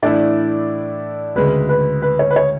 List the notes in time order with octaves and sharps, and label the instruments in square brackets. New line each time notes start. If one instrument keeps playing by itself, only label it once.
[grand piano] A2 E3 A3 E4 [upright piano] D4 D5
[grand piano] D2 C#3 G#3 [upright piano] B4
[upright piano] B4
B4
C#5
B4
C#5